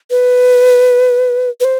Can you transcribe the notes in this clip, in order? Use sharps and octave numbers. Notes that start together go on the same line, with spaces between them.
B4
B4
C5